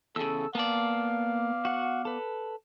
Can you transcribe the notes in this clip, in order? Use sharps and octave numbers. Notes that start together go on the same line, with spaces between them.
E2 C#3 A4 E6
A#3 B3 D5 F5 A5
F#4 F#5
A4 B4